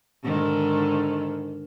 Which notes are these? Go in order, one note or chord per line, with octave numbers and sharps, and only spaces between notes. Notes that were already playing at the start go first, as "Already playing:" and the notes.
G#2 D3 D#3